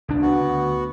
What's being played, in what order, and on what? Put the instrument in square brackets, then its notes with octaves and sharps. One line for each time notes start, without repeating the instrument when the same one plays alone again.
[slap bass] C#2 D4
[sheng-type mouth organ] B3 F#4
[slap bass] D2